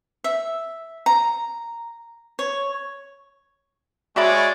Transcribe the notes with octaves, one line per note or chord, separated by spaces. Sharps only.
E5
A#5
C#5
G#3 F#4 C#5 D5 E5 B5